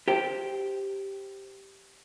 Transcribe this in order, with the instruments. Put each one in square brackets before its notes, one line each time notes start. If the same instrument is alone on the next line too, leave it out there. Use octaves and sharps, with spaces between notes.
[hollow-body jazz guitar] G4 C5 G5